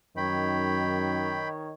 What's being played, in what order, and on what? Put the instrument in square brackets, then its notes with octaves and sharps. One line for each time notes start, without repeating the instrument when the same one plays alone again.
[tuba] F#2 [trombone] D#3 [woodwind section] D#4 C#5 [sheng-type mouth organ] G5 B5